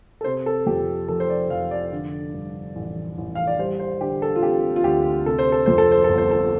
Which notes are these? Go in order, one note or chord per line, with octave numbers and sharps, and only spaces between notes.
A4
C3 C5
A4
F2 G4
F1 A4
C5
D5
F1 F5
D5
D3
G2
A1
A1
F5
D5
G3 C5
C5
D3 G4
A4
F4
C4 G4
F4
D2 G4
C3 A4
C5
A4
F2 C5
A4
C5
G1 A4
C5
A4